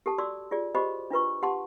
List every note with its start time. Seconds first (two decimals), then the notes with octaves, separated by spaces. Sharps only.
0.06 G4 A4 A5
0.18 F#4 D5 C6 D6 E6
0.51 F4 G#4 D5
0.75 F#4 G4 C5 D#5 B5 D6
1.10 D4 F4 B4 C#6
1.42 G4 F#5 A5 C6 D6